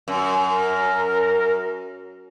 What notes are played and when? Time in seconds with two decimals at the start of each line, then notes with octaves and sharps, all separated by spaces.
0.08 F#2
0.46 A#4